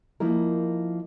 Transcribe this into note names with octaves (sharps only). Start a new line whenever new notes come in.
F3 A#3 D#4 E4 A#4